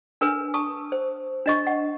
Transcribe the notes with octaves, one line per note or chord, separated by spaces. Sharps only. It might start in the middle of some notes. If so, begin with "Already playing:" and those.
D4 A#4 B4 G#5
A5 C#6 D#6
C5
D4 D#5 C#6
F#5